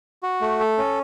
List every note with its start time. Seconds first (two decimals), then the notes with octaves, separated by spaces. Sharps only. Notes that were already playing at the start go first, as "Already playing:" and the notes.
0.23 F#4
0.41 A3
0.60 A4
0.78 C#4